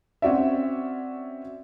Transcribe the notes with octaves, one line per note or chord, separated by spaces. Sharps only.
C4 C#4 F#4 D5 E5